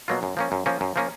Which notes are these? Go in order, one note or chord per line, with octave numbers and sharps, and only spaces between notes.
B2 F#3 A#3 F4
F#2
F3 A#3 C#4
F#2
F3 A#3 C#4
F#2
F3 A#3 C#4